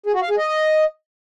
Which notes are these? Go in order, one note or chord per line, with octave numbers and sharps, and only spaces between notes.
G#4
F#4
F5
G#4
D#5